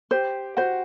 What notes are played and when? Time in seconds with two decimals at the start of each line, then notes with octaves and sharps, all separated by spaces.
0.11 G4 C5
0.57 F#4 C5